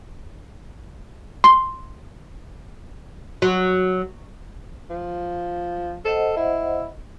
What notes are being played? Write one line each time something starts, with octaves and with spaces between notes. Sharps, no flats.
C6
F#3
F3
A4 C5 D#5 F#5
E4